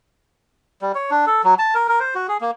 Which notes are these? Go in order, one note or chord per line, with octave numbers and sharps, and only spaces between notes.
G3
C#5
D4
A4
F#3
A5
A#4
A#4
C5
F#4
G#4
A#3